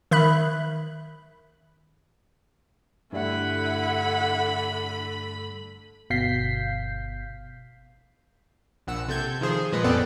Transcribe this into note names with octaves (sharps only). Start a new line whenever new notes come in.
D#3 E5 B5 F#6
G2 D3 G3 A3 E4 F#5 B5
G1 B2 F5 G6 B6 C7
A#1 F#5 E6
C3 A4 G6 G#6
D#3 F3 G#4 C5
G#4
A#2 F3 G#3 B4 D#5
A1 F2 B3 A4 D5 G5